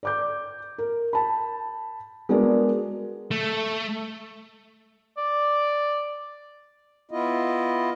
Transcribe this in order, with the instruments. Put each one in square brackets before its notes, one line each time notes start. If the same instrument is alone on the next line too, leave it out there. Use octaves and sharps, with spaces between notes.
[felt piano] D5 D6 G6
A#4
A5 B5
G#3 B3 D4 F#4 A#4 D5
[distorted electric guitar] A3
[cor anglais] D5
[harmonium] B3 E4 F4 D#5